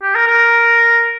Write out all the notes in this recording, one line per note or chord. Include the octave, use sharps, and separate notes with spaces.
G4
A#4
A#4